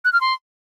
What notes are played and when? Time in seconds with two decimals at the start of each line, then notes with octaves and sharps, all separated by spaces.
0.05 F#6
0.13 F6
0.21 C6